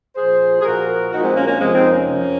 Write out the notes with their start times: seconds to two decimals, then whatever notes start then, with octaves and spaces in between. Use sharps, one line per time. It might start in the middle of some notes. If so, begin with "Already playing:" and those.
0.16 A#2 F3 G#4 C5
0.60 G#4
0.64 A#2 F3 F#4 A#4
1.11 A#2 F3 D#4 F#4
1.23 G#3 C4
1.36 A#3 C#4
1.47 A#3 C#4
1.59 F2 C3 F3 G#3 C4
1.75 C4 D#4
1.91 A#3 C#4
2.07 F2 C3 F3